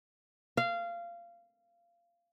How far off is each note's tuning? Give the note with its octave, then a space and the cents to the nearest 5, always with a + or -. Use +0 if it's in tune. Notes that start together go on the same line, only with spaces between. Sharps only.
F5 -20